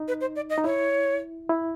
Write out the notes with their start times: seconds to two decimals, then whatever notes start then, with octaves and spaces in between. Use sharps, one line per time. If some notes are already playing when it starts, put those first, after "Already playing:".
Already playing: D#4
0.08 B4
0.21 C5
0.36 D5
0.50 D#5
0.58 D#4
0.64 E4 C#5
1.49 E4